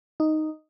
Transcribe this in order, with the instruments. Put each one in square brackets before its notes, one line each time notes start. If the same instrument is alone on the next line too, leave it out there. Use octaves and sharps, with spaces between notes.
[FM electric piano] D#4